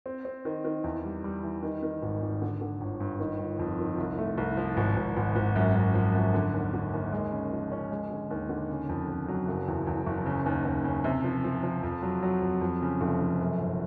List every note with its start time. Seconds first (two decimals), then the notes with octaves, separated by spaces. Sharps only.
0.06 C4
0.25 C4
0.45 D#3
0.65 D#3
0.84 E2
1.04 G3
1.24 G3
1.43 E3
1.63 D#3
1.83 D#3
2.02 G#1
2.22 G#1
2.42 D3
2.61 D3
2.81 G1
3.00 G2
3.19 D#3
3.40 G1
3.59 F2
3.79 D#3
3.98 C2
4.18 A3
4.38 C2
4.57 F3
4.77 G#1
4.97 G#1
5.17 G#1
5.36 G#1
5.56 F#2
5.75 F#2
5.94 F3
6.14 F#2
6.34 D3
6.54 D#2
6.74 D3
6.93 D#2
7.12 G#3
7.32 C#3
7.52 F3
7.72 C#4
7.91 G#3
8.10 D3
8.31 D#2
8.49 D3
8.70 C#3
8.89 F2
9.08 F2
9.28 F#3
9.48 F#1
9.68 E2
9.87 E2
10.06 F#1
10.26 C#3
10.46 D#2
10.65 D#2
10.85 C#3
11.04 C3
11.24 F3
11.44 F3
11.63 F3
11.83 F2
12.03 F#3
12.23 F#3
12.42 F2
12.61 F2
12.82 C#3
13.01 F1
13.21 F1
13.41 F#2
13.60 G1